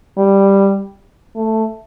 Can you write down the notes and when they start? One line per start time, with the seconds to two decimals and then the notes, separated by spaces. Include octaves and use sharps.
0.18 G3
1.36 A3